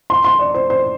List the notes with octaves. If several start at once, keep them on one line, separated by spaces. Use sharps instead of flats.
C6
C6
D5
C5
C5